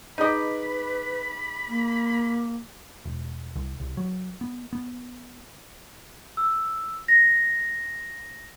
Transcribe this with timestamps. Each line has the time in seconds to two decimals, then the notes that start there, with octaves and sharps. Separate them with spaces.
0.18 D#4 G#4 B4 D#5 B5 D6
1.68 A#3
3.05 E1
3.56 C2
3.80 C2
3.97 F#3
4.41 B3
4.73 B3
6.37 E6
7.08 A#6